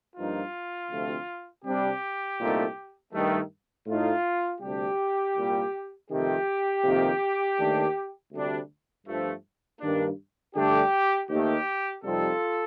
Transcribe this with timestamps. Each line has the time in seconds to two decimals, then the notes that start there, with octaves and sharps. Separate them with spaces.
0.15 G2 F3 A#3 D#4 F4
0.90 D2 C3 F3 A3 C4
1.64 C3 G3 D4 G4
2.38 C2 A#2 A3 D#4
3.13 G2 D#3 A3
3.86 A2 A3 D#4 F4
4.61 D2 C3 G3 D4 G4
5.36 C2 A#2 G3
6.10 F2 C3 D#3 A3 G4
6.83 F2 C3 D#3 A#3
7.58 D#2 D#3 A3 D4
8.33 D2 C3 G3 D4
9.07 G2 F3 A3
9.80 G2 D#3 G3 A#3 D4
10.55 G2 D3 A3 D4 G4
11.29 D#2 D#3 A3 G4
12.04 F2 C3 G3 C4 D#4 F4 A4